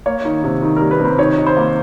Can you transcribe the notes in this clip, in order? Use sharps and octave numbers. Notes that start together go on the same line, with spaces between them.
A#3 C#5
D#3
C3
D#3
A#4
G3
B4
C3 C5
D#3 C#5
D#3
C5
A#3